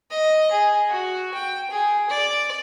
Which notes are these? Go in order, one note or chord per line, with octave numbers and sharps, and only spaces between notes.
D#5
G#4
F#4
G5
G#4
D5